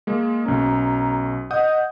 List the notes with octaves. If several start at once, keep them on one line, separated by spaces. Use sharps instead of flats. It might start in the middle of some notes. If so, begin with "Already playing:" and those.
G#3 A#3
B1 C#4 A#5
D#5 F#5 D#6 G6